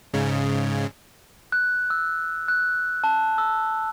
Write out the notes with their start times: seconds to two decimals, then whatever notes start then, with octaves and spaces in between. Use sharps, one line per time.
0.14 G#2 C#3
1.52 F#6
1.90 E6
2.48 F#6
3.04 A5
3.38 E6